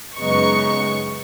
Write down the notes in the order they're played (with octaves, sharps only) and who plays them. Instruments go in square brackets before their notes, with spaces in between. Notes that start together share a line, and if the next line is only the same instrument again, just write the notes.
[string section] F#2 C#3 G#3 B3 D#4 C#6